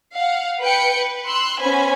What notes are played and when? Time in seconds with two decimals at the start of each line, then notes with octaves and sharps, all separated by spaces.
0.14 F5 F#5
0.61 B4 G5 G6 C#7
0.96 B4
1.26 C6 E6 F#6
1.60 B3 C#4 C5 G#5 B5